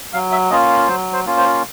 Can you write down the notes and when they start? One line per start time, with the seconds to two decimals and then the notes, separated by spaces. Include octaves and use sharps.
0.13 F#3 F5
0.32 E5
0.50 A#3 C#4 F4 D#5
0.88 F#3 C5
1.13 C5
1.25 A#3 C#4 F4
1.38 C5